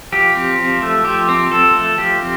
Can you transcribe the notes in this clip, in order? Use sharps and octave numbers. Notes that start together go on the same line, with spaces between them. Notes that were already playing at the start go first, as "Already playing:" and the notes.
F3 G4
C4
F3
A3
F3 G4
C4
F3 A4
A3
F3 G4
C4